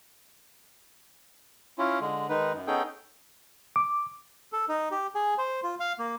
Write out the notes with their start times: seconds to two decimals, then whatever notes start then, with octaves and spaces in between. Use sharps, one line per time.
1.79 C#4 E4 F4
2.01 D3 G#3
2.29 D#3 G#3 D#4 B4
2.53 F#2
2.67 B3 C#4 D#4 G#4 A4 G5
3.76 D6
4.53 A4
4.69 D#4
4.91 G4
5.15 G#4
5.38 C5
5.64 F4
5.80 F5
5.99 A#3